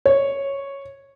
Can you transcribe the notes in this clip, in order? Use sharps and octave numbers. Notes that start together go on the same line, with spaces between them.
C#5